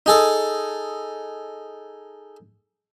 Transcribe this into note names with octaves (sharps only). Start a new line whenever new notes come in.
D#4 G#4 A4